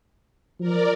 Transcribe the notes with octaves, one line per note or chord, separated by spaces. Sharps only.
F3 A#4 D5